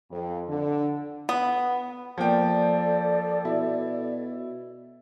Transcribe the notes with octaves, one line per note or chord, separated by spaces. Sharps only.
F2
D3
B3
F3 A#3 A4 D5 G5
B2 E4